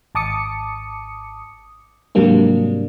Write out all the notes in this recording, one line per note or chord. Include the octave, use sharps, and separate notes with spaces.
G#1 A5 D6 D#6 C#7
G#2 C3 F#3 G3 A#3 D4